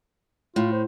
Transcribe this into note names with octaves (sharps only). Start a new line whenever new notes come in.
A2 F4
C5